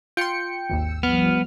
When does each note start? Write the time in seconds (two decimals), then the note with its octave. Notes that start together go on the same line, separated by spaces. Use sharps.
0.17 F4 G5 C6 C#7
0.70 G#1 D#2 E6
1.03 F3 G3 B3 F6